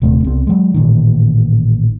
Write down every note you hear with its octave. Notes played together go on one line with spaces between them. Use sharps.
D#1 C3 A3 C4
C2 B3 C4
F#3 G#3
A1 A#2 D#3